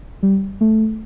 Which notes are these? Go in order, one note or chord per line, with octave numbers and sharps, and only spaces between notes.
G3
A3